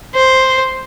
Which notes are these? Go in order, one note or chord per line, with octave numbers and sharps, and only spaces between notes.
C5